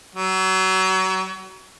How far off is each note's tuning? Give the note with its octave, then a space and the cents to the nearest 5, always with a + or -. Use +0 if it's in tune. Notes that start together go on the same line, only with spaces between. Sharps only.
F#3 +30